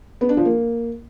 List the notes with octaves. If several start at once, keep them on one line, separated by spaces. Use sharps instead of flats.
B3
D4
F3
A#3